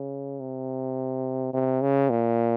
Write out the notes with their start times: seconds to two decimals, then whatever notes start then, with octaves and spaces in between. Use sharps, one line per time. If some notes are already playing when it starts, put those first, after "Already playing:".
Already playing: C#3
0.40 C3
1.53 C3
1.81 C#3
2.10 A#2